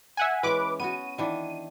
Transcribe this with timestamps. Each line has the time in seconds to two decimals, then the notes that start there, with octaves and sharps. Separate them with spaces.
0.17 E5 F#5 G#5
0.43 E3 G#3 C#4 B4 D6
0.80 B3 C#4 F#4 D#7
1.18 D#3 E3 D4